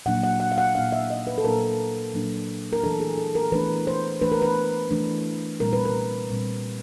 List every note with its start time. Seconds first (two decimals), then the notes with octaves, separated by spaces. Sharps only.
0.06 A#2 F#3 A#3 D4 F#5
0.23 F#5
0.40 F#5
0.52 F5
0.58 F#5
0.75 A#2 F#3 A#3 D4 F5
0.92 E5
1.10 D#5
1.27 B4
1.38 A4
1.44 A#2 F#3 A#3 D4 A#4
2.14 A#2 F#3 A#3 D4
2.73 A#4
2.83 E3 A3 D4 A4
3.00 G#4
3.18 A4
3.35 A#4
3.52 E3 A3 D4 B4
3.87 C5
4.22 E3 A3 D4 B4
4.32 A#4
4.42 B4
4.91 E3 A3 D4
5.60 A#2 G3 C4 A#4
5.73 B4
5.85 A#4
6.30 A#2 G3 C4